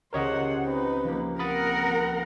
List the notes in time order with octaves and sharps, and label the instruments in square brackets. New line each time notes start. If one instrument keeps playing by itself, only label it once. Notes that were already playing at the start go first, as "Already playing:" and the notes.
[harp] C#2 G4 E7 [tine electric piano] A#4 C#5 D#5 [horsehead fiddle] C5 F#5
[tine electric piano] C4 [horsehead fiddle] D#4 B4
[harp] F3 A#3
[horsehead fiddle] C4 F#5 [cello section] A#4 [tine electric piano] B5 D#6 A6